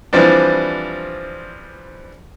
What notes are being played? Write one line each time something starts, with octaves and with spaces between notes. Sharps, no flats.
E3 F3 G3 C4 D4